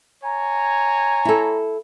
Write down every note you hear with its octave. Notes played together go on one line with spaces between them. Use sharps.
C#5 G#5 A#5
E4 A4